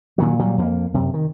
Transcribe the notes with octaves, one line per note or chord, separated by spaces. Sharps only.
A#2 D#3 F#3
A#2 F#3 G3
F2 A3 A#3
F#2 C3
D#3